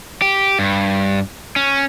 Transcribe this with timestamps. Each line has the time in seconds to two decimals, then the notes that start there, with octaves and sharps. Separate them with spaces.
0.22 G4
0.59 G2
1.56 C#4